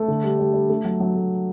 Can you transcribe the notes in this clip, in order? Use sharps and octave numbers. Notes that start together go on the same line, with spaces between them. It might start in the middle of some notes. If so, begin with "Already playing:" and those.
Already playing: A3
D3
G3
G3
G3
A3
F#3
F#3
A3